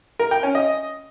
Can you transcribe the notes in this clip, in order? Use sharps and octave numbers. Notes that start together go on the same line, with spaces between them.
A#4
G5
C#4
D#5